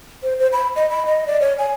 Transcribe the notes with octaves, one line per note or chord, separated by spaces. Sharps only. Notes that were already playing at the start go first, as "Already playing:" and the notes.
C5
C5
B5
D#5
B5
D#5
D5
C#5
G#5